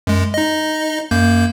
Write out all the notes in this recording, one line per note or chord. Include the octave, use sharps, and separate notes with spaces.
F#2 G#3
D#4 D#5
F#2 A#3 G6